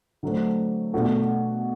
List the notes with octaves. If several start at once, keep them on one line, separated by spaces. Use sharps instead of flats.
D3 F#3 A3 C4
B2 A3 D4 F#4 A4